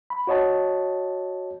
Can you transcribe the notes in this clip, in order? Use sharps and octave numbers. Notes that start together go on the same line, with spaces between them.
B5
F#4 C#5 D#5 A5